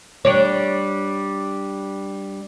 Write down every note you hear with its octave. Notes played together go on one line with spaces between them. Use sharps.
G3 D4 C#5